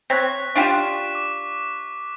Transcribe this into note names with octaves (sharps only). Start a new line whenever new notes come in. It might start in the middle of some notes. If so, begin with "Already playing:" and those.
C4 C#5 F#6 B6
D4 F4 G4 C#6 B6 E7
D6